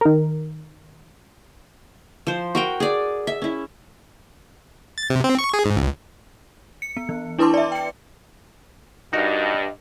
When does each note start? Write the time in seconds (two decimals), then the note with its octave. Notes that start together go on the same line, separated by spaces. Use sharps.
0.01 D#3 A#4
2.27 F3 C5
2.55 F#4 A#4 G5
2.80 G#4 D5
3.27 E5
3.42 C#4 E4
4.98 A6
5.10 C3
5.24 C4
5.39 C#6
5.53 G#4
5.65 G#2
5.77 C#2
6.82 C#7
6.97 B3
7.09 E3
7.38 D4 E4 B4 A5 C6 D6
7.54 D5 E5
7.72 G5 C#7
9.13 G2 D#4 F#4 A#4 D#5